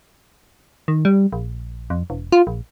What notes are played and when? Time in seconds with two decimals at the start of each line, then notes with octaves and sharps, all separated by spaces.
0.88 D#3
1.05 G3
1.33 A#1
1.90 F2
2.10 E1
2.32 F4
2.47 A#1